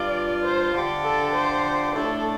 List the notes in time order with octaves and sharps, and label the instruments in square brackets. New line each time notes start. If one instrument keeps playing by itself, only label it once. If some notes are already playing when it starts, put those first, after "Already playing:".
Already playing: [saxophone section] G2 G3 F4 [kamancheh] D5
[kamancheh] C5
[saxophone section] D3 F3 D4 G4
[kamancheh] A4
C5
[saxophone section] A2 A3 D4 [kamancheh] A4